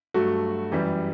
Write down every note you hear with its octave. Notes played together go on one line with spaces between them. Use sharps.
G2 F#3 A3 F#4
F#2 E3 G3 G4